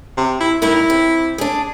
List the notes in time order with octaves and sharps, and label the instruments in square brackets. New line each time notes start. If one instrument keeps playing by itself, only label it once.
[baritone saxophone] C3
E4
[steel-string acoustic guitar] G2 D#4 A#4 [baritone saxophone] E4
[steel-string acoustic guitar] C3
D4 G#4